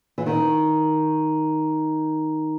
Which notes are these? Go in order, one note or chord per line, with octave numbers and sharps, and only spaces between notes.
E3
D#3